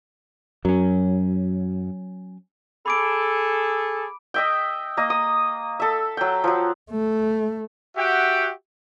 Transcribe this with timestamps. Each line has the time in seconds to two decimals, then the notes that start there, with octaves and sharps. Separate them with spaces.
0.65 F#2 F#3 C#4
2.86 G#4 A4 B5 D6 D7
4.34 D#5 E5 G5
4.97 A#3 D#5
5.10 D#6
5.80 A4 E5
6.17 F#3 G5
6.44 F3 F#3
6.90 A3
7.97 F#4 G4 E5 F#5 G5